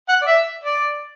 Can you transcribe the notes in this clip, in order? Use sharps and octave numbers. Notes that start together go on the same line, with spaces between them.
F#5
D5
E5
D5